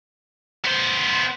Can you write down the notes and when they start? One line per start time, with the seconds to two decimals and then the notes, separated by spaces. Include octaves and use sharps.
0.65 B3 C5